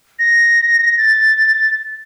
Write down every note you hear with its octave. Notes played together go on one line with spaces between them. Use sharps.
A#6
A6